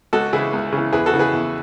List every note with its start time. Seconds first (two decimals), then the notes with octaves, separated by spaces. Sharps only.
0.13 C#2 F#4 A4
0.33 C#3 E3 E4 G#4
0.53 C#2
0.72 C#3
0.78 E3
0.93 E2 G#4 B4
1.06 F#4 A4
1.13 C#3 E3
1.19 G#4 B4
1.33 E2